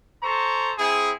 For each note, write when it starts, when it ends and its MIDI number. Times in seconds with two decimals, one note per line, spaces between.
0.23 0.72 69
0.23 0.72 72
0.23 0.72 82
0.23 0.72 85
0.78 1.11 60
0.78 1.11 64
0.78 1.11 68